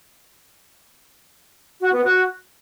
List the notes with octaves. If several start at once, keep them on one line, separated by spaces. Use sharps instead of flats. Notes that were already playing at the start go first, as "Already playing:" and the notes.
F#4
B3
F#4